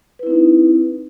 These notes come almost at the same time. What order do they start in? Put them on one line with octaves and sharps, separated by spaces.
B4 E4 C4 D#4